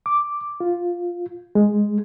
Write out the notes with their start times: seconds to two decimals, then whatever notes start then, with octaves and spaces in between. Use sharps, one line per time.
0.06 D6
0.60 F4
1.55 G#3